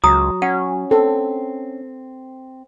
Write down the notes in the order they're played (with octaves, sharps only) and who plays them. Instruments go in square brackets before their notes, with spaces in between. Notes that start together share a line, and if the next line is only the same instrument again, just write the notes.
[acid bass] C#2 [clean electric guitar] F#3 [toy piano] A#5 D#6
[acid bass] C#4 [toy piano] F#5
[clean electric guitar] C4 [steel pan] A4